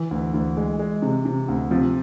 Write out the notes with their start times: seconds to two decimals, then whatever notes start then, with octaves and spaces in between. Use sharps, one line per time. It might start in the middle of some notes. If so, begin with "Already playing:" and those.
Already playing: E3
0.11 D2
0.34 D2
0.57 G#3
0.79 G#3
1.02 C3
1.25 C3
1.48 D2
1.71 C3 F3